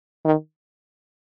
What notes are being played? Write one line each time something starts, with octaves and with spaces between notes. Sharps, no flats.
D#3